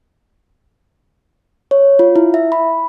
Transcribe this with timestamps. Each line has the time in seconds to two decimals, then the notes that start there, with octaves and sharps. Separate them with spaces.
1.71 C#5
1.99 F4
2.16 E4
2.34 E5
2.52 B5